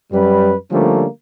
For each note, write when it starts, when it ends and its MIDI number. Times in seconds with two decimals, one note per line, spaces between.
0.12 0.53 42
0.12 0.53 55
0.12 0.53 71
0.71 1.05 50
0.71 1.05 53
0.71 1.05 55
0.71 1.05 57
0.71 1.05 58
0.71 1.05 61